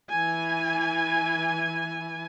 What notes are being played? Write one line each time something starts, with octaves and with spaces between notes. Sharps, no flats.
E3 G#5